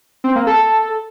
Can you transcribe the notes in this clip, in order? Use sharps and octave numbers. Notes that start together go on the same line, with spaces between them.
C4
A#3
A4